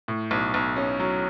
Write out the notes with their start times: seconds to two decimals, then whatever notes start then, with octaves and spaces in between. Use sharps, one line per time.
0.08 A2
0.31 B1
0.54 B1
0.76 C#4
0.99 F#3